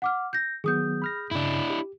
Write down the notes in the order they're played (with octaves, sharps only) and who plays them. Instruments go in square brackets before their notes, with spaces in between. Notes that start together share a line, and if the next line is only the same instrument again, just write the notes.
[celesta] F#5 D6 F6
G6 A#6
[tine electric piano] D#3 F#3 B3 [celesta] G#4 D#6 G6
[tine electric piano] B5 F6 A#6
[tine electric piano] G2 C#3 [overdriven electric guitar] D4 E4
[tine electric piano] G4